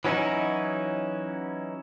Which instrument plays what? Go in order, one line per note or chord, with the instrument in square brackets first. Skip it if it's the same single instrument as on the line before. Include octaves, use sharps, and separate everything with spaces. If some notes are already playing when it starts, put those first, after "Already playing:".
[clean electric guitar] E3 F#3 C#4 D#4 E4